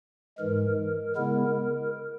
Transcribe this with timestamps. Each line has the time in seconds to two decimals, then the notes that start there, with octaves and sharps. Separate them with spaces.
0.38 G#2 E3 G#3 A#4
1.16 C#3 G#3 B3 E4 A#4